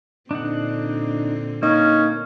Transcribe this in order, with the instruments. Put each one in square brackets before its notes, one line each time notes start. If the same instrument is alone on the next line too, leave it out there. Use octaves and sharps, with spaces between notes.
[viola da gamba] A#2 D3 C4 [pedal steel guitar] D4 D#4 F#5
[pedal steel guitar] A#3 [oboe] C#4 [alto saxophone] D#4